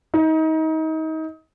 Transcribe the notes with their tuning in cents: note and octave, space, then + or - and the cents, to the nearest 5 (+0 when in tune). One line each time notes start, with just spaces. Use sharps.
D#4 +30